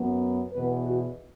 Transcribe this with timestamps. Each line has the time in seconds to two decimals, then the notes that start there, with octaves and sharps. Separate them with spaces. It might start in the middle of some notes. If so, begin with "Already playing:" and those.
Already playing: F#2 F#3 B3
0.53 E2 B2 B3 B4
0.86 F#4